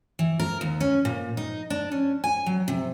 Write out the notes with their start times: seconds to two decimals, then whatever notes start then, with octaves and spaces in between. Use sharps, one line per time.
0.19 E3
0.40 A#4
0.61 D#2
0.80 C#4
1.05 A#2
1.37 D#4
1.70 D4
1.92 C#4
2.24 G#5
2.46 F#3
2.68 C3